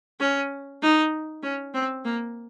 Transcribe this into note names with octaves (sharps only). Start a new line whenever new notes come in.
C#4
D#4
C#4
C4
A#3